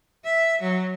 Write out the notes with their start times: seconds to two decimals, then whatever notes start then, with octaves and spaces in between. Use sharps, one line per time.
0.24 E5
0.62 F#3